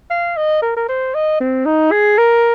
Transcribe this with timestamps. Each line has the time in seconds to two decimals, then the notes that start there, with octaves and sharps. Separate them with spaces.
0.10 F5
0.36 D#5
0.62 A#4
0.76 A#4
0.88 C5
1.14 D#5
1.40 C4
1.66 D#4
1.92 G#4
2.18 A#4